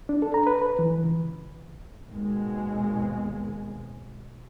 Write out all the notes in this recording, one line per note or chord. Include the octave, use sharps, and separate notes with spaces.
D4
A4
A#5
B4
B4
E3
C#2
G#1 D#2 B2 G#3